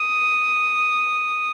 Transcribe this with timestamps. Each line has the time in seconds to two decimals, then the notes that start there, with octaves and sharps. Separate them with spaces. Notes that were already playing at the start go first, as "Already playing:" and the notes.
Already playing: D#6